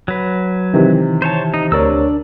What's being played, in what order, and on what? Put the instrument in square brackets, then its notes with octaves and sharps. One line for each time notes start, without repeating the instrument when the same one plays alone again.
[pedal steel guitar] F#3 B4
[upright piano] C3 [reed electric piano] D#3 E3
[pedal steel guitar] C5 C#5 A5
D#4
[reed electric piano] D2 A#4 C#5 [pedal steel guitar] D4 D5 E6